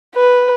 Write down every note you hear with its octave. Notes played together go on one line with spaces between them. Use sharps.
B4